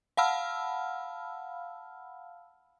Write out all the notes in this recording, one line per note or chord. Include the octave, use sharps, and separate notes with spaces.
F5 F#5 A5 B5 E6 F6